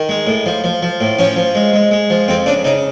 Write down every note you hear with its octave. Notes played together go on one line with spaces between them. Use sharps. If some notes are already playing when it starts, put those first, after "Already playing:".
Already playing: D#3
G#3
A2
F3
F3
F3
A2
F3 C#4
F3
G#3
G#3
G#3
F3
F2 C4
C#3 D4
C#3 D#4